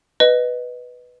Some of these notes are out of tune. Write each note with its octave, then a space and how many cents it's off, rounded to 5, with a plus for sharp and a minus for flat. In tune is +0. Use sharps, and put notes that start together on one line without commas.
B4 +0 D#5 -10